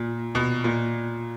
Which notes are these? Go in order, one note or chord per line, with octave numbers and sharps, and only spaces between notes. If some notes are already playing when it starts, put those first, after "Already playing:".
Already playing: A#2
B2
A#2